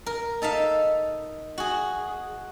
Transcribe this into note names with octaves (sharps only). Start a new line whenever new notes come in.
A#4
D#4 A4 E5 F5
F#4 G#4